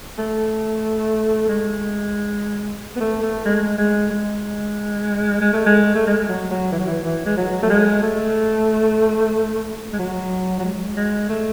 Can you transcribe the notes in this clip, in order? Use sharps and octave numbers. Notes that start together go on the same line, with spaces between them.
A3
G#3
B3
A3
A3
G#3
G#3
G#3
G#3
A3
G#3
A3
G#3
F#3
F#3
E3
F#3
E3
E3
G#3
F#3
A3
G#3
A3
G#3
F#3
F#3
G#3
G#3
A3